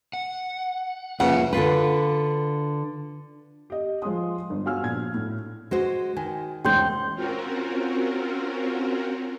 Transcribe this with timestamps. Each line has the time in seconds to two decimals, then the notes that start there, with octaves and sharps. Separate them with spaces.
0.13 F#5
1.20 F2 C#3 A#3 C4 F4 B4 E5 F#5
1.53 D3 D4 F4 B4
3.70 G4 D#5
4.02 F3 G#3 C6 D#6
4.50 G1
4.66 F#4 F5 G#5 E6 F6
4.83 A#1 G#6
5.14 A2
5.71 G#3 F#4 C5
6.16 D#3 G#5
6.65 E1 C#2 G#2 G5 C6 G6
7.15 C4 C#4 F4 F#4 A#4